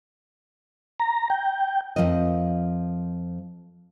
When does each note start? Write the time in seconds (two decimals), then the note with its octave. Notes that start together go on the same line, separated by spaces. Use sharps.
1.00 A#5
1.30 G5
1.96 F2 B2 F3 F4 A#4 D#5